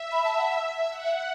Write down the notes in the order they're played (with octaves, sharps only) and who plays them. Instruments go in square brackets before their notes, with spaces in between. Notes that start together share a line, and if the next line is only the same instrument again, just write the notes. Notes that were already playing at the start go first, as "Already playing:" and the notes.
Already playing: [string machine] E5
[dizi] B5
A5
F#5
E5
[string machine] F#5